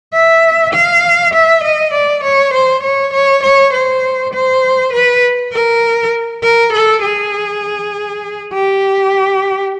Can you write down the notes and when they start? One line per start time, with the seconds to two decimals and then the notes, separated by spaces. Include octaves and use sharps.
0.13 E5
0.73 F5
1.34 E5
1.63 D#5
1.93 D5
2.23 C#5
2.53 C5
2.83 C#5
3.13 C#5
3.43 C#5
3.73 C5
4.33 C5
4.93 B4
5.53 A#4
6.43 A#4
6.73 A4
7.02 G#4
8.53 G4